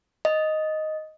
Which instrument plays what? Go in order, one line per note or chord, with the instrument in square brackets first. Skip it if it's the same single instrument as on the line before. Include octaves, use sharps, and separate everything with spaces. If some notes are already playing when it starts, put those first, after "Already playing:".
[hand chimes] D#5